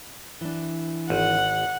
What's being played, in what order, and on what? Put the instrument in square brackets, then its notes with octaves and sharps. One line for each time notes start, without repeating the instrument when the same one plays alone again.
[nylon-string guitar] E3 D4
[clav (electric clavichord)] G#1 [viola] F#5